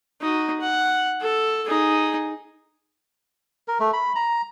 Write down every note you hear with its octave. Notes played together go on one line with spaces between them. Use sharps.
D#4 F#4
F#5
A4
D#4 G#4
A#4
A3
B5
A#5